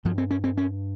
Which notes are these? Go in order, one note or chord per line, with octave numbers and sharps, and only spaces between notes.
G2 F3
C4
C#4
C4
C#4